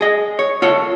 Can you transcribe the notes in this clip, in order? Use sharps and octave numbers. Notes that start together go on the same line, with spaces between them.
G#4 D#5
C#5
F4 A4 C#5